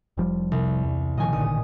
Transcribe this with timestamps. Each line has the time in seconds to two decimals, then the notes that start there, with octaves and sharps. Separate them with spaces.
0.17 F1 F3 G3
0.52 C2
0.84 E2
1.18 A#2 D#3 F3 D#5 G#5
1.33 A1 A#2 D3 D#3 D#6